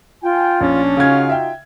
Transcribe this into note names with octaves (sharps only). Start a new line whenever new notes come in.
F4 G5 G#5
A#1 C#4 D4
C#3 D#4 F4 F#4 F5 G#6
E5 G5